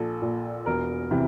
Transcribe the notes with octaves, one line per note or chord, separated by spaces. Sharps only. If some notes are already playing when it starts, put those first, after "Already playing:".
Already playing: A#1 A4
A#2
E1 A#4
C3 E3